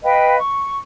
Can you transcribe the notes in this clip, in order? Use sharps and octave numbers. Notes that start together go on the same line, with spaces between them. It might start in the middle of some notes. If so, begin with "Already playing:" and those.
B4 D#5 F5 G5
C#6